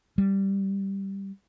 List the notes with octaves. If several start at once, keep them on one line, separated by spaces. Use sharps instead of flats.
G3